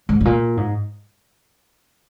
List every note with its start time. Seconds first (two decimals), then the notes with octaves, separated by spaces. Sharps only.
0.09 G#2
0.21 G#2
0.25 A#2
0.57 G#2